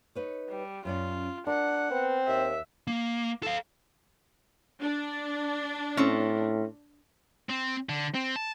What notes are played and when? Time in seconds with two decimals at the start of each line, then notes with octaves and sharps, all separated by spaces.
0.15 D#4 B4 C#5
0.49 G3
0.85 F#2 C#4 F4 D5
1.47 D4 A#4 F#5
1.91 B3 C4
2.28 D#2 E5
2.87 A#3
3.43 A4 F5
4.82 D4
5.97 A2 C4 C#4
7.49 C4
7.89 D3
8.15 C4
8.36 A5